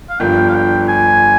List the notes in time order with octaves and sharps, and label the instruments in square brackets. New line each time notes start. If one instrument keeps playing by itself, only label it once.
[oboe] F5
[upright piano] G1 G2 F3 [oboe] G5
[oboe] F5
G5
G#5